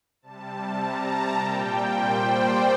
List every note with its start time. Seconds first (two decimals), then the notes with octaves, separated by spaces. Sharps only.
0.22 C3 G3 A5
0.79 A#5
1.07 A5
1.35 A#2 G3 G5
1.92 C5
2.20 D5